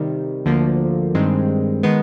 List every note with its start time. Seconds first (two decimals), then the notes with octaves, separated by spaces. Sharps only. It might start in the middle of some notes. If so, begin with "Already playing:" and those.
Already playing: C3 D#3 G3
0.46 D2 D3 F3 A#3
1.15 G2 D#3 G#3 C4
1.83 D#3 G#3 B3